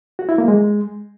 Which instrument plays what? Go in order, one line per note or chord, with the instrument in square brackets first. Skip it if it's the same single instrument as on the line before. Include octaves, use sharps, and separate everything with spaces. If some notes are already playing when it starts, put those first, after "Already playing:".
[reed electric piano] F#4
E4
A#3
G#3